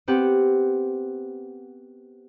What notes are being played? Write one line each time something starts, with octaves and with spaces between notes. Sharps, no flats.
B3 C4 G4 F#5